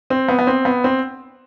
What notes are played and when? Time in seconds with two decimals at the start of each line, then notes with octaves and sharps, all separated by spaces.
0.10 C4
0.28 B3
0.39 B3
0.47 C4
0.65 B3
0.84 C4